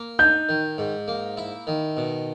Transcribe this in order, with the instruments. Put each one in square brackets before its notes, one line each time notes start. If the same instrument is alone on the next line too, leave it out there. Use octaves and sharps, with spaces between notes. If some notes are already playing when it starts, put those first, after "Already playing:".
Already playing: [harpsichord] A#3
[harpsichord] D#4 [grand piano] G6
[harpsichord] D#3
G#2
A#3
E4
D#3
B2